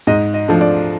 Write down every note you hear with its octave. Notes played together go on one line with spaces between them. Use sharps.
G#2 D#5
D#5
F3 A3 D4
D5